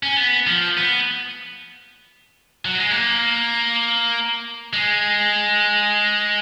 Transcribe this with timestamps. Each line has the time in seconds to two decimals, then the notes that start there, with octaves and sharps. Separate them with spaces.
0.03 C#4
0.17 B3
0.47 F3
0.77 B3
2.65 F#3
2.78 G#3
2.91 A#3
4.73 G#3